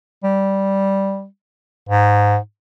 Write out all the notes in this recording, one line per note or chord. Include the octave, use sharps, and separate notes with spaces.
G3
G#2